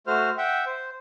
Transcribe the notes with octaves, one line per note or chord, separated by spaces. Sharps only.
A3 F#4 C5 F6
E5 F#5 G5
C5